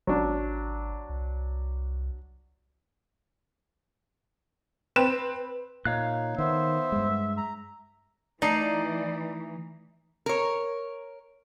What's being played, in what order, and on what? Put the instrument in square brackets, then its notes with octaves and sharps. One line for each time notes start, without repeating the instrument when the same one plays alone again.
[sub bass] G#1 [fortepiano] F#3 D4
[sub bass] C2
[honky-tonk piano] C4 E7 [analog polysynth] B4
[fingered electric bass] A#2 [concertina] D#4 [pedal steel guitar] C#5 F5 F#6
[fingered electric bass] D#3 [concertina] B3 C5 [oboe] E5
[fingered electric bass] G2 G#3
[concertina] A#5
[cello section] E3 [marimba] A3 A#5 [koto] D#4 [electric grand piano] D5 C7
[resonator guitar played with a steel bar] A#4 C#5